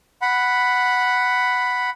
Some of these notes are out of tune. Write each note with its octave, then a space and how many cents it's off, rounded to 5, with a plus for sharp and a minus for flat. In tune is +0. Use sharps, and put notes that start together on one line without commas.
F#5 +0 B5 +0